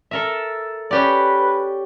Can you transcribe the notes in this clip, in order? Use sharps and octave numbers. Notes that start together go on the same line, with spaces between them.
A4 A#4 E5
C#4 G4 B4 D5